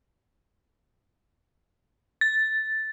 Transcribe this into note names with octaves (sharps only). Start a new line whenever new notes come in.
A6